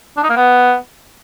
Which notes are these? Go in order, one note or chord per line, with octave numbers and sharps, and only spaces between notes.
D4
D#4
A#3
B3